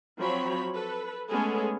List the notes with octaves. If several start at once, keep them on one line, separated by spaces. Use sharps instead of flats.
F3 F#3 C4 C#5 B5
A4 B4
G#3 A3 B3 C#4 G#4 A4